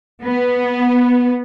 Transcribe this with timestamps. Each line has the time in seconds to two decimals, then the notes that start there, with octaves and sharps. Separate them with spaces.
0.24 B3